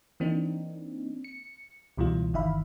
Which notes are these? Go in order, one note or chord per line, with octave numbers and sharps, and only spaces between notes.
E3 A#3 C4 D4 D#4
C#7
C#2 B2 E3 G3 F4
G1 D#3 E3 E5 F5 B5